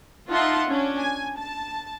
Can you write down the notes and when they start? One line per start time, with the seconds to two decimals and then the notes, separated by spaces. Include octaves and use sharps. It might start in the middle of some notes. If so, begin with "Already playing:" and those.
0.30 D#4 F4 E5 F#5 A5 C6
0.69 C#4 D4
0.99 G#5
1.37 A5